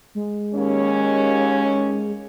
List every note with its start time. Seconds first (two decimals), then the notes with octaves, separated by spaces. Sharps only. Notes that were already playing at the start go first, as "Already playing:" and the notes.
0.15 G#3
0.54 D#2 C#4